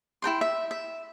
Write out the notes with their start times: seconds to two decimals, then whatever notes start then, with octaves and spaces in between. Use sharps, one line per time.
0.22 E4 A#4 G5 C6
0.41 E5
0.71 E5